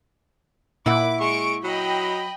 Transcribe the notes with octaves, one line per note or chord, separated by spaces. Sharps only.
A#2 E4 E5 F#5 D6
G#3 C#6 D7
F#3 D#5 G5 B5